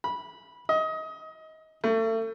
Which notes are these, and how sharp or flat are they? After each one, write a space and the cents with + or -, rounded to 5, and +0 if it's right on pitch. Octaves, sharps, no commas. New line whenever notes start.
B5 -15
D#5 +25
A3 +35